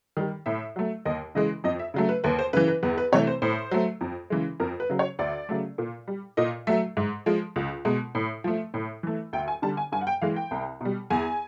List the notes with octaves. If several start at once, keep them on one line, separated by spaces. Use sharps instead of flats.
D#3 G3
A2 E5
F#3 A3
D#2 D#5
C#3 E3 G#3 D#5
F2 D#5
E5
C#3 F#3 A3
B4
D#2 B4
C5
C#3 E3 B4
B4
E2 B4
B4
C3 E3 A3 C#5
C5
A2 C5
F#3 A3
F2
C#3 E3 G#3
F2 A#4
B4
C#3 F#3
C#5
D2 D5
C#3 F#3 A3
A#2
G3
A#2 D#5
F#3 A3 E5
G#2
F3 G#3
C#2
B2 G#3
A2
F3 A3
A2
E3 A3
D2 G5
G#5
D3 G3 A5
G#5
G2 G#5
F#5
G5
E3 G#3 F5
G5
C2
B2 G3
E2 G#5